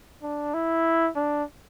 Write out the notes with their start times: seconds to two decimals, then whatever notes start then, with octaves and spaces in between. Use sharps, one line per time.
0.23 D4
0.54 E4
1.16 D4